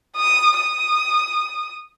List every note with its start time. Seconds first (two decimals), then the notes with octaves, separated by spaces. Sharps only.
0.16 D#6
0.58 D#6